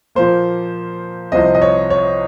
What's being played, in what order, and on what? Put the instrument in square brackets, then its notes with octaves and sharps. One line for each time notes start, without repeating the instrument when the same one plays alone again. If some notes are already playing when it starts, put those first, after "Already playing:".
[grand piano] A#2 F3 A#3 C5
C2 C3 F3 C4 D#5
D#5
C#5
C#5